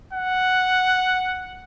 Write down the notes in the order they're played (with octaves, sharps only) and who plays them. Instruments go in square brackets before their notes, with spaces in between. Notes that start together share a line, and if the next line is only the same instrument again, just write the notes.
[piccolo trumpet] F#5